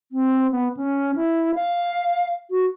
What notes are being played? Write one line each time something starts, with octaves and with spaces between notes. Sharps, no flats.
C4
B3
C#4
E4
F5
F#4